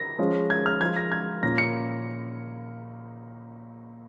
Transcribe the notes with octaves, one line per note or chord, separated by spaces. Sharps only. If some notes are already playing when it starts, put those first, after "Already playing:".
Already playing: A#6
F3 G#3 C#4 F4
G#6
F6
F3 G#3 F4 G#6
A#6
G#6
A#2 A#3 C#4 F4 A#6
C#7